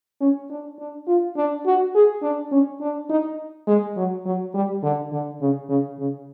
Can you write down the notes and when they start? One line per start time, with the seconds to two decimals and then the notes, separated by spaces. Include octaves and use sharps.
0.21 C#4
0.50 D4
0.79 D4
1.08 F4
1.37 D4
1.66 F#4
1.95 G#4
2.23 D4
2.51 C#4
2.81 D4
3.10 D#4
3.67 G#3
3.97 F#3
4.26 F#3
4.54 G3
4.83 D3
5.12 D3
5.41 C#3
5.69 C#3
5.99 C#3